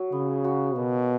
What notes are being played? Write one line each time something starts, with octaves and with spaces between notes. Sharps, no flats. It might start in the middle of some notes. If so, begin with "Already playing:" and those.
Already playing: F#3
C#3 B3
F#4
B2 A#3